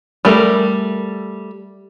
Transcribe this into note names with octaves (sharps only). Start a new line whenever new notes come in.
G3 A3 A#4